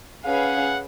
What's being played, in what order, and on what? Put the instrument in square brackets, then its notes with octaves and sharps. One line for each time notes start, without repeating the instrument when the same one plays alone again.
[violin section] C#4 G#4 B4 F5 [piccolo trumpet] F#5